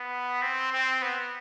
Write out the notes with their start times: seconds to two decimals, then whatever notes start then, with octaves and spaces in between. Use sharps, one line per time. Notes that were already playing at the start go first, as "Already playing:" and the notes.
Already playing: B3
0.42 C4
0.72 C4
1.02 B3